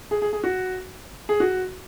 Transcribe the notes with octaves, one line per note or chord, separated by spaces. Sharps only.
G#4
G#4
G#4
F#4
G#4
F#4